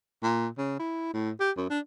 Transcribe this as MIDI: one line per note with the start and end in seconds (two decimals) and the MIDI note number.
0.23 0.47 46
0.58 0.76 49
0.79 1.09 64
1.14 1.31 45
1.40 1.51 67
1.57 1.65 42
1.70 1.79 62